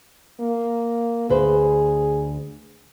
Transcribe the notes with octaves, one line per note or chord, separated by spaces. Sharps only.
A#3
D2 G#4 B4 C5